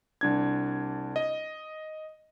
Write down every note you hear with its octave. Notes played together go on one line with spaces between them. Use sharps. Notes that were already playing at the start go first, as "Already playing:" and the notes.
C2 D4 G#6
D#5